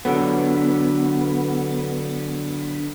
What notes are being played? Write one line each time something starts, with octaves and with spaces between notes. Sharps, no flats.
D3 F#3 B3